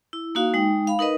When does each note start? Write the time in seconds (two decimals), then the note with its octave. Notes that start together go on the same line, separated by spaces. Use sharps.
0.13 E4
0.35 A#3 D#4 F#4 F5
0.54 G#3 D#4 G5
0.87 F5 B5
0.99 D#4 A#4 B4 D#5